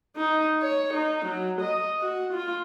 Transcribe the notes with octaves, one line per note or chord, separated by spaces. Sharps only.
D#4
C#5
D#4
F#3
D#5
F#4
F4